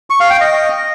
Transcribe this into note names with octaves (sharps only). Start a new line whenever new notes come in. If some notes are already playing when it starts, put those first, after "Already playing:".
C#6
F5
G5
D#5